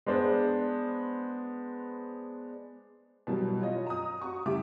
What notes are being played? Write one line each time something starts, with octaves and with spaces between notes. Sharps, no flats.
G#3 B3 D4 C5
B2 E3 F#3 G3
F4 C#5 D#5
A#5 D#6
F#4 C#6
A2 C#3 G3 G4 E5 D6